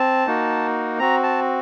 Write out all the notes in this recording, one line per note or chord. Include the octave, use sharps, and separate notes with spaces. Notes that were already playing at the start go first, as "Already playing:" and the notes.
Already playing: C4 A5
A#3 D#4 F#4
C4 F#4 A#5
A5